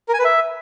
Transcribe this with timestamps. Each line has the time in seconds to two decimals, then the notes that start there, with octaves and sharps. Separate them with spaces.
0.08 A#4
0.14 G#5
0.19 B4
0.24 E5